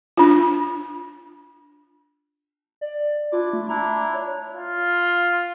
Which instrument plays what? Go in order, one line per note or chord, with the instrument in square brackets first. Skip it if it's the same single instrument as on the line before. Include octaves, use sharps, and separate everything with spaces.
[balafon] D4 F4
[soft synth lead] D5
[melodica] D4 E4 D6 [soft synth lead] F4
[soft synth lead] A3
[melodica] D4 E4 [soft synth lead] A#5
[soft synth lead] C#5
[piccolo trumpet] F4